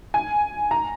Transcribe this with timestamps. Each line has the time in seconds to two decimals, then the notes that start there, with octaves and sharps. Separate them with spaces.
0.14 G#5
0.71 A#5